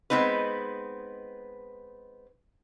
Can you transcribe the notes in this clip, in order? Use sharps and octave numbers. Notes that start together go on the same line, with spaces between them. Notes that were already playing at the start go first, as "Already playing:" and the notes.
G#3 B3 C4 D#4 B4